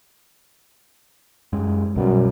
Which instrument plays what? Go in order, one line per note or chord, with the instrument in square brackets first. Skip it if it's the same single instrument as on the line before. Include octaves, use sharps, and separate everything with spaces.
[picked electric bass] F#2 G#3
[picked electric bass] B1 B2 G3 [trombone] F#2